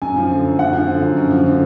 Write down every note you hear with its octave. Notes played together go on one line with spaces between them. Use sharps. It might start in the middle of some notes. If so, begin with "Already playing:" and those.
F#2 G#5
F3
D3
F#2
F#2 F#5
F3
D3
F#2
F#2
F3
D3